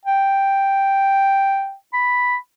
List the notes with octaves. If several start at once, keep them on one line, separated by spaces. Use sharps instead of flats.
G5
B5